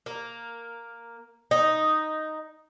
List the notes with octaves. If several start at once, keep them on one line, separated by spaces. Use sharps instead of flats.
A#3
D#4